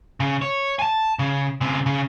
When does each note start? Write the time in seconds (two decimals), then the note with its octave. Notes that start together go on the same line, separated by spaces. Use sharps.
0.20 C#3
0.42 C#5
0.79 G#5 A5
1.19 C#3
1.61 C#3 C4
1.86 C#3